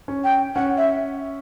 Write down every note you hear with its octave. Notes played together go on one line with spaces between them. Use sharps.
C#4
G5
C#4 F#5
E5